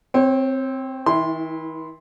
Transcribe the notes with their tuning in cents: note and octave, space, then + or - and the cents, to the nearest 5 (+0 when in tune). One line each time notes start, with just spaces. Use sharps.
C4 +0 C#5 -35
D#3 +45 E4 -10 C6 +0